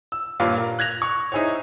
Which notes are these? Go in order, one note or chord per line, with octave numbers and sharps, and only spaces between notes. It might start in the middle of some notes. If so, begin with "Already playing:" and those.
E6
G2 A#2 F4 B4 C#5 D6
A#4
F#6 G#6 A#6 F7
C#6
D#4 E4 G#4 C5 C#5